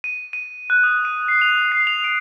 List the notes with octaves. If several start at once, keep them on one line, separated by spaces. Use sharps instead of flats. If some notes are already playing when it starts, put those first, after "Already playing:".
D#7
D#7
F#6
D#6
D#7
C7
F7
C7
F7
D7